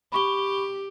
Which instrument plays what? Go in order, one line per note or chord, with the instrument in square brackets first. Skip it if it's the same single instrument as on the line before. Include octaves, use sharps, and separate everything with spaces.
[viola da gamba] G4 [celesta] B5 C#6 G7